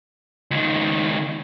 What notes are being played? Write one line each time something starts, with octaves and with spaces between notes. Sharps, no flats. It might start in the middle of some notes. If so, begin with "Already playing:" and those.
C#2 D#3